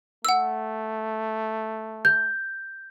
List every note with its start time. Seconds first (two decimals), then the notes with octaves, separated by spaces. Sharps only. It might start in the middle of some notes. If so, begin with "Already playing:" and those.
0.25 A3 F#5 E6
2.05 G6